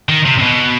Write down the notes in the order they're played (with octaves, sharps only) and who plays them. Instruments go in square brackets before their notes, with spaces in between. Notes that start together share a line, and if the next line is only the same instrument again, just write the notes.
[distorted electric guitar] D#3
C3
C3
B2